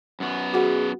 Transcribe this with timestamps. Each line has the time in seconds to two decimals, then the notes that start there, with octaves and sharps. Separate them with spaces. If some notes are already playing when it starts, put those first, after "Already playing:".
0.20 F#2 B3
0.54 F#4 G#4 F#5